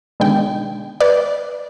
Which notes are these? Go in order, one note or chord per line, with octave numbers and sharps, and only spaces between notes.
B2 D3 D#3 G#3 G5
B4 D5